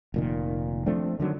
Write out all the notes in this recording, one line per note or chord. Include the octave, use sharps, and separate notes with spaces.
F1 A#2 D#3
F3 A3 C4 D4
D3 D#3 F#3